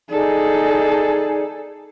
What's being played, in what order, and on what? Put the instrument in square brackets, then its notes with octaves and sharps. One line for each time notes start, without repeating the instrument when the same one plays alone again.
[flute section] D#4 G#4 D5 [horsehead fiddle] A4